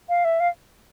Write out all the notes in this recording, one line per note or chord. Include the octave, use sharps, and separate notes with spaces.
F5
E5
F5